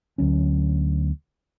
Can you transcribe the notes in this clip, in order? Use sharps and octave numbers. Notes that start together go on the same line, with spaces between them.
D2 F#3 C#4